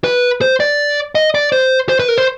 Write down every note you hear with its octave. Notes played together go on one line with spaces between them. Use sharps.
B4
C5
D5
D#5
D5
C5
C5
B4
A#4
C5